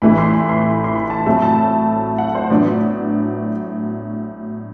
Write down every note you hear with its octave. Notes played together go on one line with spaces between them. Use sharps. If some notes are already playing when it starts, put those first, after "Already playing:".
A1 A2 E3 A3 B5
C6
B5
C6
C6
B5
A5
A2 F#3 A3 C4 A5
A5
F#5
C5
A2 F#3 B3 D4 D5